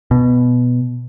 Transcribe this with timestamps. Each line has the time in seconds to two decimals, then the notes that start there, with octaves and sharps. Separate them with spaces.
0.11 B2